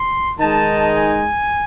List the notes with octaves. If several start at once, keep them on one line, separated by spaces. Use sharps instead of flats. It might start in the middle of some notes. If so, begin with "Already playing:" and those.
Already playing: C6
D#3 G#3 D#4 A5
G#5